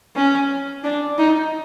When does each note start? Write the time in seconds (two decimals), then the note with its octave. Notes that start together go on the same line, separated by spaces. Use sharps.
0.16 C#4
0.83 D4
1.18 D#4